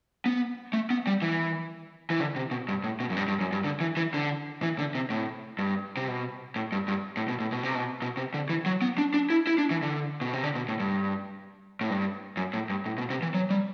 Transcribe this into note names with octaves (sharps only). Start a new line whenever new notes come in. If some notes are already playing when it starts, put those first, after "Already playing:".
B3
A3
B3
G3
E3
E3
D3
C3
B2
G2
A2
B2
F#2
G2
G2
F#2
G2
D3
E3
E3
D3
E3
D3
C3
A2
G2
C3
B2
A2
G2
G2
A2
B2
A2
B2
C3
B2
B2
C3
D3
E3
F#3
B3
D4
D4
E4
E4
D4
E3
D3
B2
C3
D3
B2
A2
G2
A2
G2
F#2
A2
G2
A2
B2
C3
E3
F#3
G3